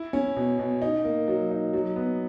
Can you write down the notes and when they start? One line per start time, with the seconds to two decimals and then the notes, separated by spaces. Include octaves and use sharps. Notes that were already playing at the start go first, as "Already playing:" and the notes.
Already playing: E4
0.13 C#4
0.36 B2
0.59 B2
0.82 D#4
1.05 A#3
1.28 F#3
1.51 D#4
1.73 F#3
1.96 B3